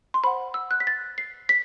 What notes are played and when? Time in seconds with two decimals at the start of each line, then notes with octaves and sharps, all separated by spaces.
0.14 C6
0.24 C5 F#5 B5
0.54 E6
0.71 F#6
0.80 B6
0.87 A6
1.18 C7
1.49 B6